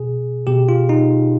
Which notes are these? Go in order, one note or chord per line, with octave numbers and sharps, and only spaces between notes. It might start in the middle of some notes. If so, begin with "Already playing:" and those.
Already playing: B2 G#4
B2 G4
F4
D#4